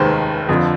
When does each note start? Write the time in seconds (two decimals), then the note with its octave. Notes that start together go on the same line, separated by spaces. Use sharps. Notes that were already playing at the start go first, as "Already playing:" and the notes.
Already playing: F1 D#2 D#3 G#3 B4 C5
0.49 F2 D3 F3